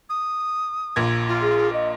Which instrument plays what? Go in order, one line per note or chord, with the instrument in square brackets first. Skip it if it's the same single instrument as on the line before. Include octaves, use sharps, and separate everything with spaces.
[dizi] D#6
[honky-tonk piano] A#1 A#2 G#6
[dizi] F4
[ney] G#4
D#5